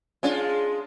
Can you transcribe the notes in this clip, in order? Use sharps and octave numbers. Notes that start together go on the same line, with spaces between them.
G#3 C#4 D4 F4